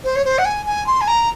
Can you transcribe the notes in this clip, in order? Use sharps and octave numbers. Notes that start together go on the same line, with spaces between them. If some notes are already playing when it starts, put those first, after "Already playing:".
C5
C#5
C5
F#5
G#5
G#5
C6
G#5
A#5